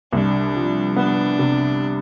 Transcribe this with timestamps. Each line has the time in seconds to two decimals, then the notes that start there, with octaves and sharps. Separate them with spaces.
0.12 C2 D4
0.55 F3
0.96 B3 D4
1.39 C3